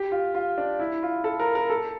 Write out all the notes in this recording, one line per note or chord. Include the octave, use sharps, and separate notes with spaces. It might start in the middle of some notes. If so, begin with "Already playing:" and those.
Already playing: G4
F4
F4
D4
E4
F4
A4
A#4
A#4
A4